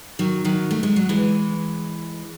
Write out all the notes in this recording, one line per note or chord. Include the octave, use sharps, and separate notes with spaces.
D#3 F#3
D#3 F#3
A3
G#3
F#3
E3 G#3